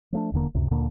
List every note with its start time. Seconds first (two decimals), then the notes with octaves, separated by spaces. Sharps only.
0.12 F3 A3 D4
0.32 D#1 E2 D3 A#3
0.55 C#2 F#2 C3
0.71 D2 A#2 D3 A#3